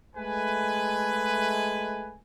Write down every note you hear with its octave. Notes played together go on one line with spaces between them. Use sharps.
G#3 A3 B4 G#5